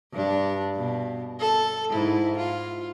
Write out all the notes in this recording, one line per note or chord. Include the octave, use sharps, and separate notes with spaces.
G2 D4
B2
A4
G#2 E4
F4